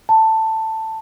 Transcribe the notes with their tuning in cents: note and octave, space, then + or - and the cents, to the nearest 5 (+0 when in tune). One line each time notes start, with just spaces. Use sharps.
A5 +10